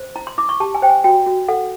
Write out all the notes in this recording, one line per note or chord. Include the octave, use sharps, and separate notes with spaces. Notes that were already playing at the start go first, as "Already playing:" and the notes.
Already playing: C5
E4 A#5
C6
E4 D6
C#6
G4 A5
G#5
C5 G5
G#5
F#4 G5
F#4
A4 F#5